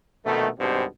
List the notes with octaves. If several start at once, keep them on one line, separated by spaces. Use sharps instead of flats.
A#1 B2 D#3 A3
G#1 G2 B2 C4 G4 C5